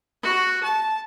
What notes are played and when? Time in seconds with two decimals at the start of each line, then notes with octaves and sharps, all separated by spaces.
0.23 F#4
0.64 A5